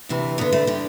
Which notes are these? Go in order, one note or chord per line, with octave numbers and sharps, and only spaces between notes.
D2 C3 E3
G2 D3 B3
A3
D3 G3